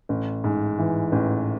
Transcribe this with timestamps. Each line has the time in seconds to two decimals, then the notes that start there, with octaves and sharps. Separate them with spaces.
0.09 A1
0.44 G#2
0.79 E3
1.12 A1